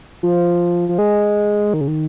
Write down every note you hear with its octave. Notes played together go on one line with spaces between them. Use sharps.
F3
F3
G#3
D#3
C#3
D#3